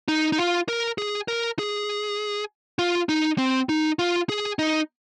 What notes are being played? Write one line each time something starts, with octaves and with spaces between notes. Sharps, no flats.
D#4
D#4
F4
A#4
G#4
A#4
G#4
F4
D#4
C4
D#4
F4
G#4
D#4